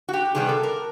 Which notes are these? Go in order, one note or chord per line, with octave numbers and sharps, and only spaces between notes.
F#4
G4
C3 D#3 G3 B3 G#4
A4
A#4